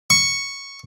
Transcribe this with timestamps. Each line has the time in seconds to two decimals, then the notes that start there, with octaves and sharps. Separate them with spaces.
0.10 C#6